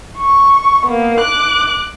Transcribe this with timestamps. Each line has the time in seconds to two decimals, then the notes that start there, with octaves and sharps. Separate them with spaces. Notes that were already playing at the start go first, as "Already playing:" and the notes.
0.17 C#6
0.86 A#3 B3
1.20 D6 F#6